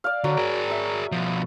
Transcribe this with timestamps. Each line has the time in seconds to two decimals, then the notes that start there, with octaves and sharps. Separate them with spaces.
0.04 D5 F5
0.24 D3 F#3
0.37 G#4 A#4
0.71 E5
1.12 B2 F3